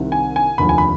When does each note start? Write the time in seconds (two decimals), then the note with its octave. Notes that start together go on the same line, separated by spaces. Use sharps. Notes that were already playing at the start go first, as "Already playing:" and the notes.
Already playing: C2 C3 D#3
0.12 G#5
0.36 G#5
0.58 F1 D#2 D3 F3 B5
0.69 G#5
0.78 B5